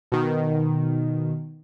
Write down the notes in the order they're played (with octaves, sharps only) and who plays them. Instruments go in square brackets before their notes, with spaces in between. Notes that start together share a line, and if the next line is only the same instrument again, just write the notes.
[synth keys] B2 D#3